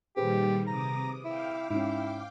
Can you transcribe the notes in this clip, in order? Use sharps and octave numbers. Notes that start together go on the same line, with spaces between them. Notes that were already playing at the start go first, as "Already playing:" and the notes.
A#2 D#3 G3 G4 G#4 B4 C5
C3 A#5 D6 D#6
E4 F5 G5 D6
G#2 C#4 E4